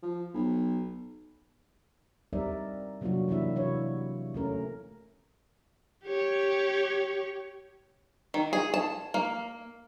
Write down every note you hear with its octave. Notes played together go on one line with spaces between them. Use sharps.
F3
B1
G3 C4 D#4 A#4 D5 E5
C3 F#3 A#3 D4 F4 F#4
E3 A#3 D4 E4 E5
C3 E4 F#4 C#5
A3 C#4 A#4
G4 C#5
D#3
G#4
A5
A#3